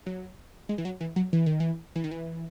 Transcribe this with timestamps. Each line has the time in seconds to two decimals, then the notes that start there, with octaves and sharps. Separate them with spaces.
0.06 F#3
0.69 G#3
0.78 E3
0.85 F#3
1.01 E3
1.16 F#3
1.33 E3
1.46 D#3
1.60 E3
1.96 E3
2.04 D#3
2.11 E3